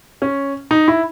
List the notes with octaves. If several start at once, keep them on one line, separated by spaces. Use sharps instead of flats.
C#4
D#4
E4